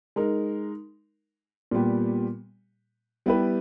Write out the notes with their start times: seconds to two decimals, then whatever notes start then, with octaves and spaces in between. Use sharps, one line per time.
0.16 G#3 D#4 A#4
1.71 A#2 G3 B3 G4
3.26 G3 B3 E4 G4 B4